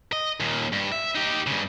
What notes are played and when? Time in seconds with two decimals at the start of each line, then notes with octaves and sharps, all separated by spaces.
0.13 D#5
0.40 D#2 A#2
0.72 G2
0.92 E5
1.15 D#4 G4
1.47 G2 C#3